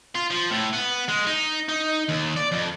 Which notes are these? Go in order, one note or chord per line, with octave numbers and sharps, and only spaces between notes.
F4
F3
A2
B3
G#3
D#4
D#4
D#2
D5
F2